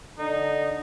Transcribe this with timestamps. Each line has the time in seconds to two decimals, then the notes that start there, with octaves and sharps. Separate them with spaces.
0.19 D3 D#4